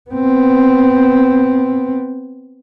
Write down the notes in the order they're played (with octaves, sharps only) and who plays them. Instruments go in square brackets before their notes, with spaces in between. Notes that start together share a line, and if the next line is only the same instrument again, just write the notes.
[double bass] B3 C4